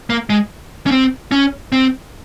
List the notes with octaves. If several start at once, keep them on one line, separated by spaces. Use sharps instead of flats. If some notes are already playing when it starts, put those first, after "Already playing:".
A#3
G#3
C#4
C4
C#4
C4